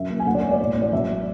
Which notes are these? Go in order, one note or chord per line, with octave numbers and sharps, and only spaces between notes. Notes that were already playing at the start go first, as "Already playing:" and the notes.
Already playing: F#2 E5
F#1
G#5
D2 F#5
D5
E1 C#5
D5
A2
A1
D5
F#3 E5